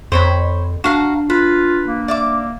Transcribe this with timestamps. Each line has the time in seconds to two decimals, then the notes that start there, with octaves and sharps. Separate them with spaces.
0.12 F2 C5 C#5 B5
0.84 D4 F#4 F5 A#5
1.30 F4 B4
1.86 A#3
2.08 D5 E5 D6